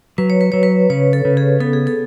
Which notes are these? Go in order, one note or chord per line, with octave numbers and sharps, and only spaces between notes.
F#3 B4
C#5
B4
F#3 C#5
B4
C#3 C#5
A4
C#3
G#4
B3 A4
G#4
A4